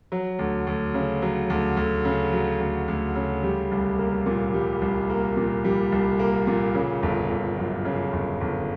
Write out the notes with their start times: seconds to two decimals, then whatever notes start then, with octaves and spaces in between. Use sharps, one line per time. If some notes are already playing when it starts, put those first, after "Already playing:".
0.12 F#3
0.39 D2
0.67 D2
0.94 C#3
1.22 F#3
1.50 D2
1.77 D2
2.05 C#3
2.33 F#3
2.60 D2
2.88 D2
3.16 C#3
3.43 G3
3.71 C2
3.99 A#3
4.26 A#2
4.54 G3
4.81 C2
5.10 A#3
5.37 A#2
5.65 G3
5.92 C2
6.19 A#3
6.47 A#2
6.75 C#3
7.03 G1
7.30 G1
7.58 F#2
7.85 C#3
8.13 G1
8.41 G1